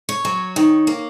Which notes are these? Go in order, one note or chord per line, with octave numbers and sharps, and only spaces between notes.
C#5
F#3
D#3
A#3